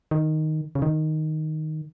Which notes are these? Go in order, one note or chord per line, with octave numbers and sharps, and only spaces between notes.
D#3
C#3
D#3